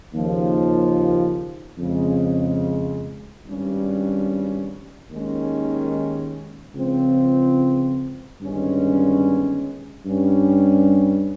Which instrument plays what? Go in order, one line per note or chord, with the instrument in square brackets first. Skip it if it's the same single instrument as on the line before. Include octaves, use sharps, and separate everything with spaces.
[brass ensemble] D#2 C#3 F3
F2 C#3 G#3
G#1 G2 G3 C#4
D#2 D#3 G#3 C#4
C#2 C#3 F3 C4
G1 G2 D#3 G#3 C#4
G2 G3 C#4